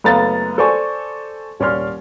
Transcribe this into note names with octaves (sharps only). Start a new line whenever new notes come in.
F#1 A3 B3 F5 A#5 A6
A4 C5 D5 G#5 C#6
D#1 C#4 D5 C6 F6